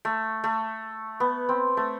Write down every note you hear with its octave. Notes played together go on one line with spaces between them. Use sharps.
A3
A3
B3
C4
A3